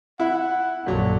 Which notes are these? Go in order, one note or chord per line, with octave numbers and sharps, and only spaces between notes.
E4 F#5
A#1 F#2 A#2 D3 F#3